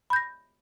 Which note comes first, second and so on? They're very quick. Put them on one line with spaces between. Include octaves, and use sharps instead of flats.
B5 G6 A#6